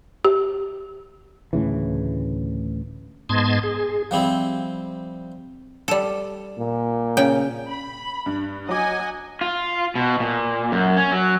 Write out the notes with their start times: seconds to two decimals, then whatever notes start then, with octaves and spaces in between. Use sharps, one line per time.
0.25 G4
1.53 D2 A2 C#3 E3
3.29 G#2 B3 D#5 A5 C6 G#6
3.63 G#4
4.11 F3 G3 C4 E4
5.88 G3 A4
6.59 A#2
7.17 C#3 G5
7.68 B5
8.26 G2
8.69 F#3 D#5 F#5 G#5 D6
9.41 F4
9.95 B2
10.20 A#2
10.72 F#2
10.97 C#4
11.12 F#3